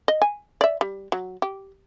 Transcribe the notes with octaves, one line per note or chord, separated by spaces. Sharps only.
D#5
G#5
D5 E5
G3
F#3
G4